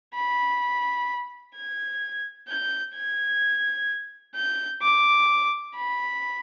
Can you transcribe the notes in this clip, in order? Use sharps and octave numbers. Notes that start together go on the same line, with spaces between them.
B5
G#6
G6
G#6
G6
D6
B5